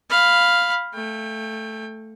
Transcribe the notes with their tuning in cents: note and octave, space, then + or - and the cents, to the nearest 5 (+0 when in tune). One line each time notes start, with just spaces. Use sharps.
F5 +0 B5 +0
A3 +0 G5 +30